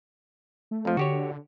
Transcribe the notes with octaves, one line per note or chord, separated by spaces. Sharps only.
A3
F2 F3
D3 F#4 G4 C#5